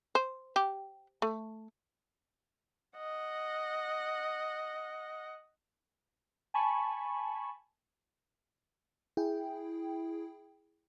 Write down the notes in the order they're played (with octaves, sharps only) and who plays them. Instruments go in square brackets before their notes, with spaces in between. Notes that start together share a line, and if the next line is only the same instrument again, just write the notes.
[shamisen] C5
G4
A3
[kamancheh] D#5 F#5
[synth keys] G#5 A5 B5 C#6
[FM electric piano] E4 G#4 G5